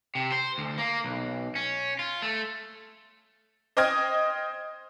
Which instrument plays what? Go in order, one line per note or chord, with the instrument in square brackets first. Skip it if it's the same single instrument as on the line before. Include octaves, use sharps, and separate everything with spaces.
[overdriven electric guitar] C3
C5
D2
A#3
B1
C#4
F4
A3
[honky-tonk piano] C5 D#5 G5 D#6 F6 G#6